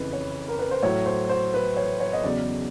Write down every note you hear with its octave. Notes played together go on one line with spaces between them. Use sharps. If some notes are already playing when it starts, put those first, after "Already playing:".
Already playing: F2 C#3 E3 B4
C#5
A#4
B4
C5
A2 F#3 C#5
C5
C5
B4
C#5
C#5
D#5
E2 C#3 F#3 D5